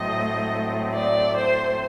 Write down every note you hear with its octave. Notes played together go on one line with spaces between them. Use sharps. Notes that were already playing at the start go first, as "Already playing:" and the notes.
Already playing: A2 F#3 A3 C4 D#5
D5
C5